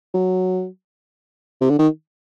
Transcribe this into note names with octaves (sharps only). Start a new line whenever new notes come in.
F#3
C3
D3
D#3